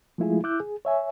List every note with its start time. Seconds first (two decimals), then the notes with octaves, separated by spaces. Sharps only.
0.18 F3 G#3 A3 E4 F4 G#4
0.44 E4 D6 E6 F#6 G6
0.60 G#4
0.85 C#5 E5 G#5